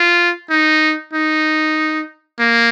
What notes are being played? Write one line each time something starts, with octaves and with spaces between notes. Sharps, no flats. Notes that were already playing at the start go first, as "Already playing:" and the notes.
Already playing: F4
D#4
D#4
A#3